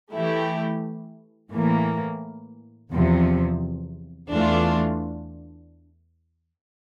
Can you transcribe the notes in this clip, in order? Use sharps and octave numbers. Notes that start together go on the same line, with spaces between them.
E3 A3 E4 G4
A2 E3 A#3
E2 C3 F3
E2 E3 A3 D4 F4